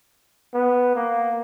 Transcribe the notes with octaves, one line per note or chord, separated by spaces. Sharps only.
B3
A#3